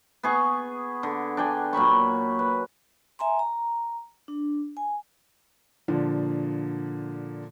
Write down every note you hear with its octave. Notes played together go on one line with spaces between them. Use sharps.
B3 G#4 C#6
D3
D4 G5 G#5
A#2 F#3 B5 C#6
B4
E5 G#5 A#5 C6
A#5
D4
G#5
A#2 D3 F3